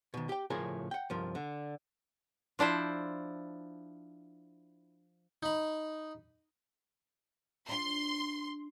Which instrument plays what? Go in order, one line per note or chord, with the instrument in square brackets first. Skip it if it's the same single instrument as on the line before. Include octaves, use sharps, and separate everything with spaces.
[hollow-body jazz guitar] B2 D#3
G4 G5
A2 C#3 F3 G#4 A#4 A5
F#5 G5
C2 G2 F3 A#4
D3
[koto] F3 D4 E4 C5
[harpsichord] D#4 B5
[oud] D4 F4 [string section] C6